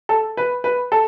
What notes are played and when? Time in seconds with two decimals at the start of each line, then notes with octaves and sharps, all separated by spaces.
0.09 A4
0.37 B4
0.64 B4
0.92 A4